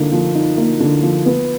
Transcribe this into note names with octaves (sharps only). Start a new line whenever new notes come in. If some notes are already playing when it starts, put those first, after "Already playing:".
Already playing: D3 F3 A#3 D#4
F3
D#4
A#3
D3
F3
B3